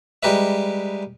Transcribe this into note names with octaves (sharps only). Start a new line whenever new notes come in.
G3 G#3 G4 A#4 B4 E5